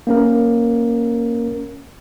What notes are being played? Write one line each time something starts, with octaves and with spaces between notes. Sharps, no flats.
A#3 C#4 A#4